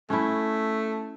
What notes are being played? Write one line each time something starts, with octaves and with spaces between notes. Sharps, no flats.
A3 C#4 E4